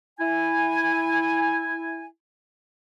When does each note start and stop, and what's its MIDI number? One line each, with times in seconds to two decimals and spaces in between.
0.20 2.07 64
0.20 2.07 80